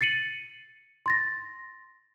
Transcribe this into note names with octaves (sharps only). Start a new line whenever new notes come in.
A6 C7 C#7 D#7 F#7
C6 A6 A#6